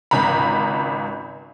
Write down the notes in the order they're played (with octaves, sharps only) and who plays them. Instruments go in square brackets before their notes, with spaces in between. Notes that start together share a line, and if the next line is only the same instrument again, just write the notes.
[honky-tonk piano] G#1 C#2 A#5 B5